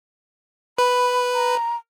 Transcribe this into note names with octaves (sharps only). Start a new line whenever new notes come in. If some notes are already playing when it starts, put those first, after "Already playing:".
B4 B5
A#5